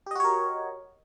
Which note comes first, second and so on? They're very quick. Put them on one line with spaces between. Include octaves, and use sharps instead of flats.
G4 D#5 F#4 C#5 A#4